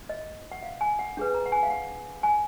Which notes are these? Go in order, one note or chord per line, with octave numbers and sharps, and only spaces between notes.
D#5
F#5
F5
G#5
F#5
D4 G#4 B4
A#5
F#5
G#5
F5
F#5
G#5